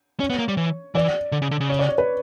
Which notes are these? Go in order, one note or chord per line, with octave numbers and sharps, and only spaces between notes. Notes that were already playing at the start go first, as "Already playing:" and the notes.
C#4 C#5
B3
A#3
G3
E3
E3 D5
D3
C#3
D3
C#3
C#5
D5
C#5
B4